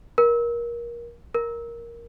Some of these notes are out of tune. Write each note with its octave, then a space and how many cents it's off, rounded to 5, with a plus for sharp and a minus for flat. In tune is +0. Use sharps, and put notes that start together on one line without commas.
A#4 +25
A#4 +5